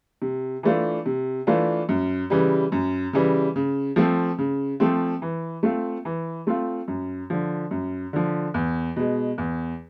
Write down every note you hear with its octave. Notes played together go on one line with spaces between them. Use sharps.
C3
E3 A3 D4 F4
C3
E3 A3 D4 F4
F#2
C#3 E3 G3
F#2
C#3 E3 G3
C#3
F3 A3 C4
C#3
F3 A3 C4
E3
A3 C4 F4
E3
A3 C4 F4
F#2
D3 F3
F#2
D3 F3
E2
B2 G#3
E2